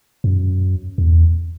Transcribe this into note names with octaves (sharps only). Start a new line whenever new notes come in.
F#2
E2